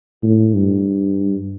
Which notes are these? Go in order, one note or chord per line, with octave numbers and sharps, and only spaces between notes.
A2
G2